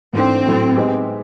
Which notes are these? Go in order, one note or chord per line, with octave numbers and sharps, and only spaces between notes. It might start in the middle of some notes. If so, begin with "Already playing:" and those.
G#2 E3 A3 C4 D4
A2 F#3 A3
G#3 B3 D#4 G4